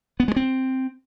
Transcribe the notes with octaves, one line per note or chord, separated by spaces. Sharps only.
B3
G#3
C4